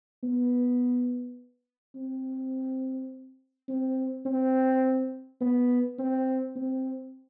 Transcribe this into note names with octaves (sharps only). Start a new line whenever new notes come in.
B3
C4
C4
C4
B3
C4
C4